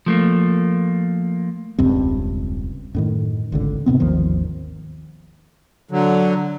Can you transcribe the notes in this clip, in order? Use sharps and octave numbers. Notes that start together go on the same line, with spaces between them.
F3 A3 A#3
E1 C#2 G2 C4
F#2 A2 D#3
G#1 C#2 D3
G#2 C3 B3 C4
G#1 D#2 D#3 F3
D3 F#3